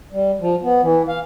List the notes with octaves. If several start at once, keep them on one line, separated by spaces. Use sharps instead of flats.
G3
F3
B3
E3
F5